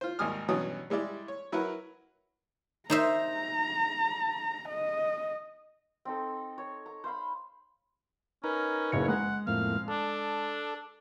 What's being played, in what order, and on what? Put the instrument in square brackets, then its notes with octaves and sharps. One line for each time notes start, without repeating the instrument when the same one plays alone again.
[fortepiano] F4 C5
G#1 D#2 G3 G#5 D#6 F6
G2 B2 E3 F#3 C#4 D#6
G3 G#3 E4 D5
C#5
F#3 E4 A#4 B4 C#5 F#5
[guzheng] D#4 C5 E5 [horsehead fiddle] A#5
[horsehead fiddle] D#5
[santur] C4 D#4 A4
C#5
A#5
C5 F5 B5
[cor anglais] C#4 [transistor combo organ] D#4 A#4 B4
[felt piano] F#1 G#4 C#7 [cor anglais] C#5
[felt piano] G#3 [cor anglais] F#5
[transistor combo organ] F2 A2 A#3 [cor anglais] F5
[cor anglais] D4 [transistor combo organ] A4